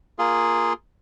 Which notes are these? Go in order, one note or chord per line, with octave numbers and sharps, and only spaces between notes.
A#3 F4 G#4